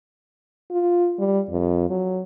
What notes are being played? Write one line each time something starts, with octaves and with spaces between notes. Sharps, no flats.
F4
G3
F2
F#3